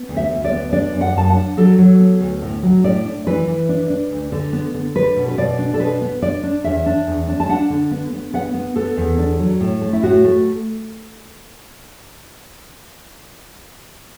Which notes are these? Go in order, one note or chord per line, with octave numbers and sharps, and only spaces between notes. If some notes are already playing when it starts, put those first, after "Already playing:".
Already playing: B3
D2
E5
D2
D5
B3
D4 D5
F#2
F#5
F#2 A5
F#5
D4
F#3 A4
F#3
B3
D2
A2
F#3
A2 D5
D4
E3 B4
E3
D4
D4
D2
D3
B3
D3
D4 B4
B2
B4
B2 D5
D4
A4
B2 B4
B3
D4 D5
D4
E2 E5
D4
E2
D4
A5
D4 F#5
D3
B3
B3
B3 F#5
B3
B3 A4
E2
D4
F#3
A2
A3
E4
A2 F#4
A3